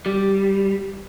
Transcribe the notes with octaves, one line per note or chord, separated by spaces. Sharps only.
G3